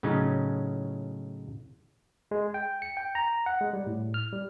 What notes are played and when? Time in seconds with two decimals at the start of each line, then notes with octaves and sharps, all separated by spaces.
0.03 A2 C#3 F#3 C#4 D#4
2.31 G#3
2.54 G5
2.82 C#7
2.97 G5
3.15 A#5
3.46 F#5
3.61 G#3
3.73 G3
3.87 A2
4.14 F6
4.32 G3